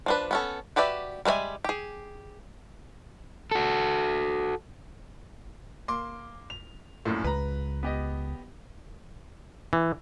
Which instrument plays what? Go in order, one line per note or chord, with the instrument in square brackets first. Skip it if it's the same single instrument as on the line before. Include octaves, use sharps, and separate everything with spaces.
[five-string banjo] F3 D4 B4
B3 C#4 A4
F#4 G4 B4 D5 E5
G3 G#3 B4 E5 G#5
G4 G#4
[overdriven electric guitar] F#4 A4
[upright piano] A#3 C6 D6
F7
A#1 F#2 A2
[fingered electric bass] C#2 [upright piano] B4 A#5
[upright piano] B3 G4 D#5
[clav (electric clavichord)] E3